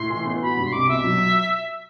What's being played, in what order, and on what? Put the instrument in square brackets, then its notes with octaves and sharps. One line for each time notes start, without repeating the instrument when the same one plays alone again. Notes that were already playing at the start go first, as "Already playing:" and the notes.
Already playing: [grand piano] A2 [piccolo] C6
[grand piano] E3
B3
[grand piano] F#4 [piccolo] B5
[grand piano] G2
[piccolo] C6
[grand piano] C2 [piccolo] D6
[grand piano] B2 [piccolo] E5
[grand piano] F#3